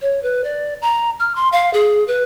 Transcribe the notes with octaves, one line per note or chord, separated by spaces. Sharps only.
C#5
B4
D5
A#5
F6
C6
F5
G#4
B4